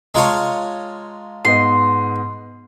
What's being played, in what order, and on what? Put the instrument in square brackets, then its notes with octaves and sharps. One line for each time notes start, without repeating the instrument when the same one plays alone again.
[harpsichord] G#3 F4 C#5 [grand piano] A5 A#5
[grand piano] G#2 B3 D#5 [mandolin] C6